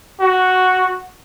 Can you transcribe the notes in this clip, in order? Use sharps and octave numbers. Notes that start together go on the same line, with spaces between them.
F#4